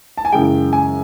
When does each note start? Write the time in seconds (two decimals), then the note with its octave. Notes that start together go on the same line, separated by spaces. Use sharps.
0.18 A5
0.25 G#5
0.32 F#2 C#3 E3 G#3 G5
0.73 G#5